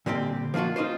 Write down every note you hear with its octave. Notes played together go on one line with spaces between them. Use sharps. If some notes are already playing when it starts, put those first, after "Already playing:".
A#2 D3 G3 C4 G4
F3 A#3 D4 F4 F#4
C#4 D#4 F4 C5